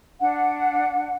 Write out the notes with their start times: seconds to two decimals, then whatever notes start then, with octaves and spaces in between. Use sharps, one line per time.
0.20 D4 F#5